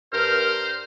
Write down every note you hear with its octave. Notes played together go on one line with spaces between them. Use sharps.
G2 A#4 C5 F6